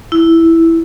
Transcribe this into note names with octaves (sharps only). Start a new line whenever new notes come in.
E4